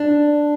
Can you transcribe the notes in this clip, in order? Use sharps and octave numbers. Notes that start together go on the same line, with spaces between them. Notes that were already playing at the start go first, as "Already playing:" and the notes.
Already playing: D4